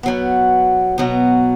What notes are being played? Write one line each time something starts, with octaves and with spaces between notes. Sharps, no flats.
B2 F#3 B3
B2 F#3 B3